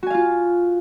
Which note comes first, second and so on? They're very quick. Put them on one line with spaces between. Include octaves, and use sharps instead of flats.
F#4 G#5 F5 F4